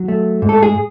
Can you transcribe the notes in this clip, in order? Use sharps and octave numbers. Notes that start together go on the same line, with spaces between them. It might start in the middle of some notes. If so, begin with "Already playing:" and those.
Already playing: F#3
A3
G#2
A4
G#4